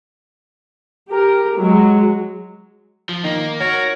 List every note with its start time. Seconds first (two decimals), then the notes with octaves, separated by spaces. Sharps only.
1.09 G4 A#4
1.57 F#3 G#3
3.09 F3
3.24 D#3 A#3
3.60 F#4 A#4 C#5